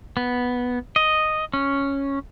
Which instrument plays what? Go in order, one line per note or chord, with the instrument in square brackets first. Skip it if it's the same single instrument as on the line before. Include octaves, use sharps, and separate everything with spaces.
[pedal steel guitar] B3
D#5
C#4